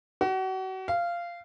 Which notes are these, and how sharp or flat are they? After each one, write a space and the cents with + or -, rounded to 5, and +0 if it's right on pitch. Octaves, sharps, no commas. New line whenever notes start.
F#4 +35
F5 -15